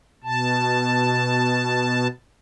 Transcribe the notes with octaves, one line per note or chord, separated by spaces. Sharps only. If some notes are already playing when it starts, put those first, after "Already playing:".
B2 A5